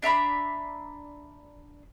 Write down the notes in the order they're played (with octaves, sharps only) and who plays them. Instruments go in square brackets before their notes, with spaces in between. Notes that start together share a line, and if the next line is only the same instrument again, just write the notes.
[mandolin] D4 E5 A#5 B5